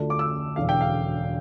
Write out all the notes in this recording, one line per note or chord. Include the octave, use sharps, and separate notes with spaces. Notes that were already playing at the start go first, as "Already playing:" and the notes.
Already playing: D2 D3 A3 D4 F4
D6
E6
E1 E2 D3 F5
G5
F5